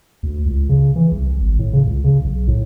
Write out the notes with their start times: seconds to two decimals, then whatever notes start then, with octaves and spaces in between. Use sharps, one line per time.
0.23 D2
0.46 C#2
0.69 C#3
0.96 E3
1.12 C2
1.40 G#1
1.59 A2
1.73 C#3
1.87 C#2
2.04 C#3
2.24 B1
2.48 A2